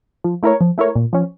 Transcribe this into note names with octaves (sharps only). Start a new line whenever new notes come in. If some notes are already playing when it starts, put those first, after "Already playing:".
F3
A3 E4 A#4 C#5
F3
A3 E4 A#4 C#5
A#2
F3 C#4